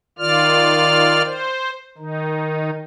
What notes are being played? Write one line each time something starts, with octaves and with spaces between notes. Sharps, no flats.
D#3 F4 D5 F6
C5
D#3 D#4